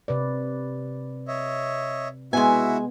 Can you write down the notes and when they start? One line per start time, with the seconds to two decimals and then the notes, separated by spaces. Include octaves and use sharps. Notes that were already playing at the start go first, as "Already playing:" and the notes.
0.08 C3 B4 D5
1.28 C#5 D#5 E5
2.33 G#3 B3 E4 F#4 E5 G#5